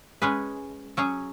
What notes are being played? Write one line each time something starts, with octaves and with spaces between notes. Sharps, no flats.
G#3 C#4 G#4 B4
F#3 C#4 G#4